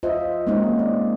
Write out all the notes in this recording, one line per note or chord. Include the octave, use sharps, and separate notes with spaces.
F4 C5 D#5 E5
G#3 A#3 C4 C#4 D#4 F#4
D5